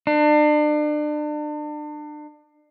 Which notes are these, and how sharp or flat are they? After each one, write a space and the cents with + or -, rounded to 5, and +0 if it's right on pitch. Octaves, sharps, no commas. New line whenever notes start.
D4 +35